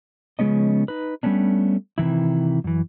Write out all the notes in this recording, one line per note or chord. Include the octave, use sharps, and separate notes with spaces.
C#3 F3 G#3 B3 C#4 D#5
D#4 B4
G3 A3 B3 C#4 D4
C3 D#3 E3 E4
F#2 E3